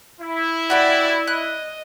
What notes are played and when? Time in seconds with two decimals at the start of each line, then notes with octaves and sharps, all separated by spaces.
0.20 E4
0.70 F#4 G4 D5 E5 B5
1.27 D#5 F#6